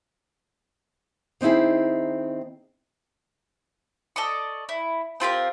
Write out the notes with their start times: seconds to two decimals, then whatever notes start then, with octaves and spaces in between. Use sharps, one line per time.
1.41 D#3 C4 D#4 E4 G#4
4.16 A4 D5 D#5 C#6
4.69 E4
5.20 C4 F4 G4 A#4